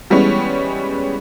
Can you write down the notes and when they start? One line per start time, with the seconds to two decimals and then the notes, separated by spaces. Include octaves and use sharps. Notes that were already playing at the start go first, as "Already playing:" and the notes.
0.10 E3 G3 G#3 B3 C#4